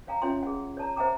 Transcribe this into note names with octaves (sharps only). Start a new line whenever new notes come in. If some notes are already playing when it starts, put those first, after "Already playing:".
C#5 F5 G5 A#5
C#4 F4 C#5 E5 G5 C6
G#4 F#5
C#5 D5 A5 A#5
C5 E5 F#5 G5 A#5 D6